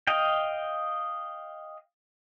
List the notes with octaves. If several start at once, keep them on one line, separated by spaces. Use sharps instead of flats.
D#5 F5 G5